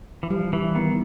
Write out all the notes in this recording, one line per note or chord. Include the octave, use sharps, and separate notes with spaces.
E3
F3 G3
E3 G3
D#3 B3